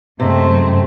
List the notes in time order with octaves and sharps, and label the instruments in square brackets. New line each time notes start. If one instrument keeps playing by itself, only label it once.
[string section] F#2 [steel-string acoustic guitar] C3 G#3 [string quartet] A3 C4